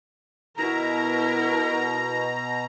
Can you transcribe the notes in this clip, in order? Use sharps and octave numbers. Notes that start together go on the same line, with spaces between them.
B2 E4 A#4 A#5